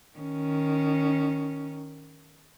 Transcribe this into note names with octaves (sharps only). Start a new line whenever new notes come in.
D#3 C#4